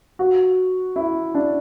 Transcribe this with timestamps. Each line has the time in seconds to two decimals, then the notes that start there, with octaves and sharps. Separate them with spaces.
0.19 F#4
0.96 E4
1.35 D4